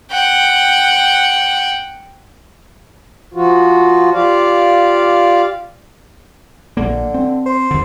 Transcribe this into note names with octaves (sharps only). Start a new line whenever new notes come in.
F#5 G5
F3 F4 F#4
F4 G4 D5 F5
A#1 D3 A#3
C4
C5
D#2 D3